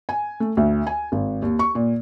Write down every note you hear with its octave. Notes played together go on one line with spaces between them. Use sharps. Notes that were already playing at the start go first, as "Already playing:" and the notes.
G#5
A3
D2
G#5
G#1
D#2
C#6
A#2